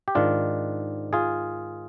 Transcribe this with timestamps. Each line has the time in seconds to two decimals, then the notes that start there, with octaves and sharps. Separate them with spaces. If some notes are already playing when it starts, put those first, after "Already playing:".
0.08 G4
0.15 G#2 D#3 D4 F4
1.13 F4 G#4